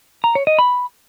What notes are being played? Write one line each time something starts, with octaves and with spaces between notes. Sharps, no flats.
A#5
C#5
D#5
B5